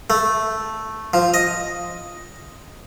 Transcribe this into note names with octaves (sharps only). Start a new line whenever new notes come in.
A3
F3
D#5